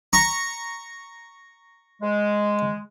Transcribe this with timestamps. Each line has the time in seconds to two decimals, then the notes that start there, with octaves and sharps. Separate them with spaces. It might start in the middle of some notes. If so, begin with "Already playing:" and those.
0.13 A#5 C#6
2.02 G#3